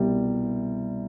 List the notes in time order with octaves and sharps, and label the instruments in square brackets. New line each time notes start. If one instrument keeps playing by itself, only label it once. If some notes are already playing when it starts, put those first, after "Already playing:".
Already playing: [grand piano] C2 B2 G3